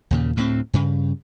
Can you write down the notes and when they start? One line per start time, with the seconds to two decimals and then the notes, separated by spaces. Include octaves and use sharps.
0.11 D#2 A#2 C#3
0.36 D2 A2 A#3 C4
0.73 G2 C#3